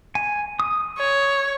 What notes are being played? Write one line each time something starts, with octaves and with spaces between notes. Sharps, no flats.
G#5
D#6
C#5